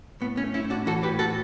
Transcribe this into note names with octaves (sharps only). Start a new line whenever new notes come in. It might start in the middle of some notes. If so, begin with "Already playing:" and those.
A2 B3
C#4
A3
C#4 E4
A2
D4 F#4
E3 F#4 A4
G4 B4
A2
F#4 A4